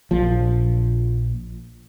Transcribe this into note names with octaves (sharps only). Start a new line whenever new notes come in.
A#1 A#2 F3